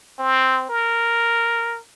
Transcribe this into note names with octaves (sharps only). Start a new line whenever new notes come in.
C4
A#4